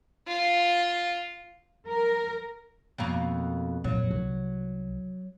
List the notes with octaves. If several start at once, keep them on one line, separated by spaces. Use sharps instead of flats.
F4
A#4
F2 B2 A#3
F2 A#2 F#3
C2